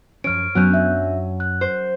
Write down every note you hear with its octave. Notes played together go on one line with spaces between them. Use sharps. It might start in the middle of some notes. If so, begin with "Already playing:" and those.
F#2 F3 C#4 C#5 F6 D7
F#2 F#3 B3 C#4 F#6 G6
D4 E5
F#6
C5